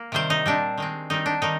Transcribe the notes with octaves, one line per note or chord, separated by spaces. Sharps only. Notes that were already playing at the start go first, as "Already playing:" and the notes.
Already playing: A#3
C3 D#3 G3 C4 C5
D#4
A#2 G3 C4 D4
D#3 G#3 C4
D#3 G3 C4 D#4
D4
D#3 G3 D#4